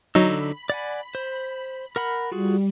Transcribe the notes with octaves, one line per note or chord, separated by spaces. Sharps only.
D3 F#3 D#4 B5 E6
D5 F#5 G#5
C5
A#4 F#5 B5
G3 F4 F#4 G#4